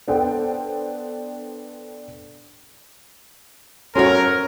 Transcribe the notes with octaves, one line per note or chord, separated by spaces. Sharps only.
B3 D4 A4 C5 G5
C#4 F#4 A4 A#4 C#5 C6